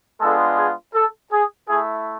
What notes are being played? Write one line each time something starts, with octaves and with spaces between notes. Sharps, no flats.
G#3 B3 D4 F4 A4
G#4
A4
G#4
A3 E4 G#4